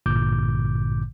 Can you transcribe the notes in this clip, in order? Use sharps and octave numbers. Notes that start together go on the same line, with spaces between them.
A1 G2 A#2 D3 D6 G6